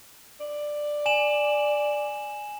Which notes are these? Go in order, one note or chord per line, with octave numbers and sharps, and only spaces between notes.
D5
G#5 E7 F#7